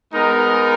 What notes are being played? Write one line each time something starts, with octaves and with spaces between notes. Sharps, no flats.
G#3 B3 D#4 A#4